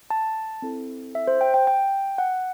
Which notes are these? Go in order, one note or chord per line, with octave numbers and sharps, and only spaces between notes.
A5
C4 E4 A4
E5
C5
G5
G5
G5
F#5